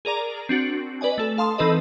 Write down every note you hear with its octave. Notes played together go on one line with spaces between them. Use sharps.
G#4 A#4 D5 A#5
C4 D4 F#4
B4 D5 D#5 G#5
A3 A4
A4 F5 A5 C6 D#6
E3 C4 D#4 A4 B4 D#5